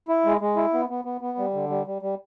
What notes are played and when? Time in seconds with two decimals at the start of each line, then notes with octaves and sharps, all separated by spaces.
0.08 E4
0.25 G#3
0.41 G#3
0.57 E4
0.74 B3
0.89 B3
1.05 B3
1.21 B3
1.38 G3
1.53 D3
1.69 G3
1.86 G3
2.02 G3